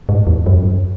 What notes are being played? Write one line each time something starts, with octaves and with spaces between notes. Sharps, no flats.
G#2
E2
F#2